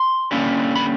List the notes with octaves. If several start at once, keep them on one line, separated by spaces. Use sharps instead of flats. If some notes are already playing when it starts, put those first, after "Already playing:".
Already playing: C6
D3 G3 A#3 C#4 E4
B5